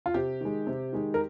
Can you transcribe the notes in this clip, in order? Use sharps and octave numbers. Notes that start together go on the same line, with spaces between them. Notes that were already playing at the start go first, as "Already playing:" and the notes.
F4
C3 G4
D#3 G#3
C3
D#3 G#3
A#4